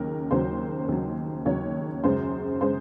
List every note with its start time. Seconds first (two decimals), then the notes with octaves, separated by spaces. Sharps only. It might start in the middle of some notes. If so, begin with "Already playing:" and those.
Already playing: D#2 C#3 F#3 A#4
0.31 D#2 C#3 F#3 C5
0.88 D#2 C#3 F#3
1.46 D#2 C#3 F#3 C#5
2.03 F#2 C#3 G#3 C5
2.61 C#3 G#3 C5